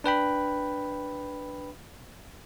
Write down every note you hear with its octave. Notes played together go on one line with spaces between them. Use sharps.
D4 B4 G5 B5